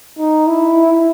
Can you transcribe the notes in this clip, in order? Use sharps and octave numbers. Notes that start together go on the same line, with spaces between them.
D#4
E4